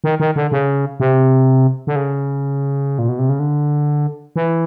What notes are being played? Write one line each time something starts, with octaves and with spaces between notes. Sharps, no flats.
D#3
D#3
D3
C#3
C3
D3
C#3
A#2
B2
C3
C#3
D3
E3